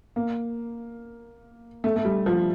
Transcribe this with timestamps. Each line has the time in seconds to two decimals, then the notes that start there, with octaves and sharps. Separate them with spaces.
0.16 A#3
1.84 A3
1.96 A3
2.05 G3
2.26 F3